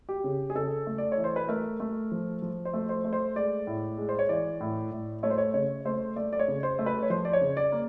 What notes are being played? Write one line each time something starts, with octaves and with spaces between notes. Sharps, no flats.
G4
C#3
G#4
C#3 A4
A3
D5
C#5
E3
C5
B4
A3 A#4
A3
F3
F3
C5
A3
C5
A3
C5
G#3 D5
A2
G#3
C5
C#5
E3 D5
A2
A2
A3 C#5
C5
C#5
C#3 C#5
A3 C5
A3 D5
D5
C#5
C#3
C5
A3
B4
C#5
F3 C5
D5
C#5
C#3
D5
A#3